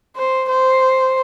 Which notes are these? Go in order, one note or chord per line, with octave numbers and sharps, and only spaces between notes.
C5
C5